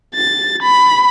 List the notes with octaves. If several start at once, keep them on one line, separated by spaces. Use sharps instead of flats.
A6
B5